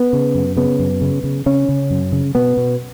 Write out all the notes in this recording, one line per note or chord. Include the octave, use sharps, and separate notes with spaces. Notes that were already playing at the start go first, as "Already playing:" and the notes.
Already playing: B3
C#3
F#2
C#3 B3
F#2
C#3
C#3
C#3 C#4
C#3
F#2
C#3
B2 B3
B2